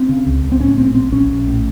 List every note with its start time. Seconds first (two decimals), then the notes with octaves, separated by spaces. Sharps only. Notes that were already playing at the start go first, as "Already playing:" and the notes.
Already playing: C4
0.09 C#3
0.26 C#2
0.43 C#2
0.52 C4
0.60 A2 C#4
0.78 A#1 C4
0.95 A#1 C4
1.12 A#1 C#4
1.30 A#1
1.47 A2